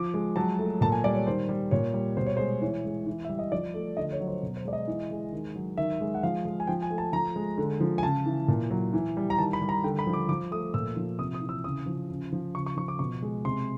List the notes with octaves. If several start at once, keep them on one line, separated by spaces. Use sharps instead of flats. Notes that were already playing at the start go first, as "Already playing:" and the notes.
Already playing: F3 D6
G#3
F#3 A5
A3
A#2 A5
G#5
G3 D5
C#5
D#3 C5
G3
A#2 C#5
G3
B2 C5
C#5
G#3 C5
E3 C#5
G#3
E3
G3 E5
D#5
F3 D5
A3
D3 D#5
C#5
F#3
C5
B2
C5
G#3 D5
D#5
E3
G#3
D#3
F#3
D#3 E5
G#3
F#5
F3 F5
G#3
G#5
F3 G5
G#5
A3
A5
F3 A#5
G#3
D3
F3
G#5
C#3 A5
E3
A#2
F#3
E3
G3
A#5
D#3 A5
B5
G3
A#5
D3 G5
B5
F3
D6
F3 D6
A3 D#6
A#2 E6
F3
C3 D#6
D#6
E3
E6
C#3 D#6
F3
C#3
F3
C#3 C#6
C#6
F3 C#6
D6
B2 C#6
G#3
C3 C6